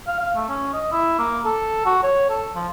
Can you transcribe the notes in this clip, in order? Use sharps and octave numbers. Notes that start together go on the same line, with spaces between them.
F5
F5
A3
C#4
D#5
E4
A#3
A4
F#4
C#5
A4
F3